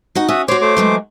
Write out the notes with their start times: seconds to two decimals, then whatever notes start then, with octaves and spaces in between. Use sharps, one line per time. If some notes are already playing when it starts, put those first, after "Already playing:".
0.15 D#4 F#4 F#5
0.29 C#4 F#4 E5 D#6
0.48 F#4 C5 C#5 D6
0.61 A3 C5 D6
0.77 E3 F#3 G#3